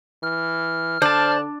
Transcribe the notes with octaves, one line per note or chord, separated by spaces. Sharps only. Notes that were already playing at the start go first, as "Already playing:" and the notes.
E3 F6
D3 D4 C5 A5